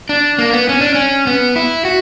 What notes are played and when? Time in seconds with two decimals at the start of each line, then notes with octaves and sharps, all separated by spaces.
0.09 D4
0.38 A#3
0.53 B3
0.69 C#4
0.81 D4
0.94 C#4
1.27 B3
1.56 E4
1.85 F#4